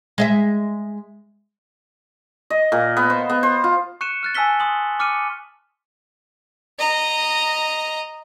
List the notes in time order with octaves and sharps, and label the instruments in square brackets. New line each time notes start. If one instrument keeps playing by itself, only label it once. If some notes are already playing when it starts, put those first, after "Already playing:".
[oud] G#3 D#5 E5
[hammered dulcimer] D#5
A#2
B3
C5
B3
C5
F4
[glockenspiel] C#6 F#6 C#7 D#7 E7
F6 F#6 A6
G#5 A5 E6 F6 B6 G7
C6 D#6 F#7 G7
D6 F6 C#7 D#7
[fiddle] D#5 A#5